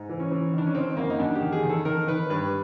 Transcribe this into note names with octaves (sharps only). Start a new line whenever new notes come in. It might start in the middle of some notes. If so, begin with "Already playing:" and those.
Already playing: G#2
E3
C#4
E3
D#3 D4
C#4
D#3 C4
F#2 A#3
D#4
F#2 D4
G4
D#3
G#4
D#3
A4
D#3 A#4
D#3 B4
G2 B4